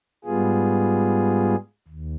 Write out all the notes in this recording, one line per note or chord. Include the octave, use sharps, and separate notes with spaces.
G#2 G3 B3 F4 G#4
D#2